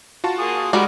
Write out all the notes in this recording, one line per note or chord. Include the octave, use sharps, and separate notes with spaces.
F4 F#4 A5
A#3 G#4 D#6
G3 G#3 D#4 F#4 A#4 B5 D6